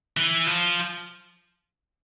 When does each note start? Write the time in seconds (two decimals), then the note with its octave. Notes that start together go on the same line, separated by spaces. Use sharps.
0.17 E3
0.47 F3